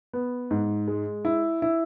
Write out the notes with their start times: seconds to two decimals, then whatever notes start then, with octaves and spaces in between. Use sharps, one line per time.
0.13 B3
0.51 G#2
0.88 G#3
1.25 E4
1.62 E4